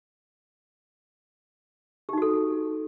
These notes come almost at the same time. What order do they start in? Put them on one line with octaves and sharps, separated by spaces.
G4 D#4 F#4 A4